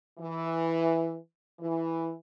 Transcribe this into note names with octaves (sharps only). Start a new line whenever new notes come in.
E3
E3